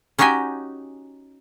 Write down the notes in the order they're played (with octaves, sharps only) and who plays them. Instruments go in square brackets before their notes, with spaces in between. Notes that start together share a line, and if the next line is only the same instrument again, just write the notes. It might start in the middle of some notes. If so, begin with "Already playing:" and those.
[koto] C#4 D#4 F#4 G4 G5 G#5